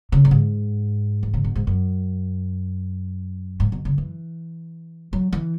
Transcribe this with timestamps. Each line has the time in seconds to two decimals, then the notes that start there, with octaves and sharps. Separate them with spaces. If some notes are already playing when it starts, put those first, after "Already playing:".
0.12 C#3
0.25 B2
0.31 G#2
1.23 E3
1.34 C#3
1.44 B2
1.56 G#2
1.67 F#2
3.60 G#2
3.72 B2
3.85 C#3
3.98 E3
5.13 F#3
5.33 E3